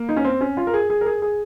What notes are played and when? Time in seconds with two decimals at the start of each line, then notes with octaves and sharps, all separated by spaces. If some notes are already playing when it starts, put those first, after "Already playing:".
Already playing: A#3
0.09 D#4
0.16 C#4
0.24 C4
0.41 C#4
0.57 F4
0.67 A#4
0.74 G#4
0.90 G#4
1.01 A#4
1.06 G#4
1.22 G#4